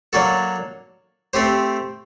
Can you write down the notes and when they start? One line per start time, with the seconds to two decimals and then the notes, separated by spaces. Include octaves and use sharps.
0.13 F#3 A#3 D4 F#4 A4
1.33 A3 C4 G4 C5